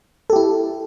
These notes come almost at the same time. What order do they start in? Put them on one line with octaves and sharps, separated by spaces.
A4 G4 E4